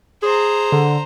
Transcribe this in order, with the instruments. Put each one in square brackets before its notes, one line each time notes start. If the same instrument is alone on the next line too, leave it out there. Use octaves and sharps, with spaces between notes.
[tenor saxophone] G#4 [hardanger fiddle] C5 A#5
[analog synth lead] D3